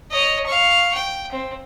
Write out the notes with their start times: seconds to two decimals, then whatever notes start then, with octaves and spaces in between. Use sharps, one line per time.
0.11 C#5 D#5
0.46 F5 C#6
0.94 G5
1.32 C4